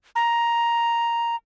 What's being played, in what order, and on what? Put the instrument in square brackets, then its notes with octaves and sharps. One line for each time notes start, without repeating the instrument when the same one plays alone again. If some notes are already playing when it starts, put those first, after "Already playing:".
[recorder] A#5